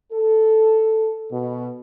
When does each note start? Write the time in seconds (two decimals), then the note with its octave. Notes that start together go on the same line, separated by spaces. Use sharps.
0.12 A4
1.31 B2